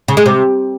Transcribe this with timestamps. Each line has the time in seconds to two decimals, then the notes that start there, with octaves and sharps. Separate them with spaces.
0.08 C#3
0.17 G#3
0.26 C3